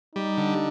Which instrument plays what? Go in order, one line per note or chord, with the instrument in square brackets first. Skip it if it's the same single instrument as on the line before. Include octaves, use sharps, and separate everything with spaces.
[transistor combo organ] G3 [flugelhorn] D#4
[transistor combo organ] D3